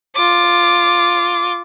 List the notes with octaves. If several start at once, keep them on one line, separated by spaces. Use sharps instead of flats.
F4 D6